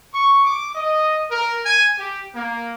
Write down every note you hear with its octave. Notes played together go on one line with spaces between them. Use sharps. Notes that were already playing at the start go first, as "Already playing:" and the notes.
C#6
D6
D#5
A#4
G#5
G4
A#3